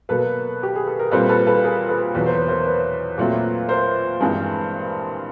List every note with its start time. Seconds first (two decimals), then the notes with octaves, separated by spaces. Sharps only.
0.09 B2 F#3 A#3 A4 B4
0.63 G4
0.76 G#4
0.87 A4
0.99 A#4
1.11 A#2 G3 C4 A4 B4
1.29 A4 B4
1.47 A4 B4
1.64 G#4 A#4
1.89 A4 B4
2.15 E2 B2 F#3 B3 C#5
2.26 C5
2.38 B4
2.48 A#4 C5
2.66 B4 C#5
3.18 A#2 F#3 A3 C4
3.69 A#4 C5
4.21 G2 E3 G#3 C4